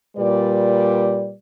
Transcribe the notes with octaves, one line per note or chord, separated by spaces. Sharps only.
A#2 G3 B4 D5